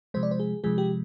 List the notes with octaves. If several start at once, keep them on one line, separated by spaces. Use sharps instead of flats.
C3 F3 G#3 C5
D5
C5
G#4
C3 F3 G#3 G#4
G4